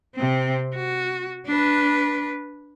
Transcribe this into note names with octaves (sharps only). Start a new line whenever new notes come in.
C3 C4
F#4
D4 B4